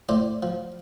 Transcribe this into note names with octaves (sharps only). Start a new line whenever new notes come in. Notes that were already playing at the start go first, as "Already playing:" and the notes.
A2 C5 D5
F3